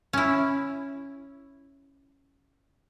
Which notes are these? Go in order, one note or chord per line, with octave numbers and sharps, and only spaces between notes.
C#4 E4